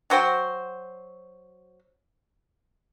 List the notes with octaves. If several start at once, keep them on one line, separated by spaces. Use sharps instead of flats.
F#3 F#4 C5 G5